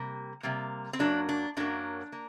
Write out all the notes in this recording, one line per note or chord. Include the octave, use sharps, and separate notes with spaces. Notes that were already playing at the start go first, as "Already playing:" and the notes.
Already playing: C3 G3 A#3
C3 G3 A#3
C4
F#2 F#3 A#3 D4
D4
F#2 F#3 A#3 D4
A#3